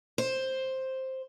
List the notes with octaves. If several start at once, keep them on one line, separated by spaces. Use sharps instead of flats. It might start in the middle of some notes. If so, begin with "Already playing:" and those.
C5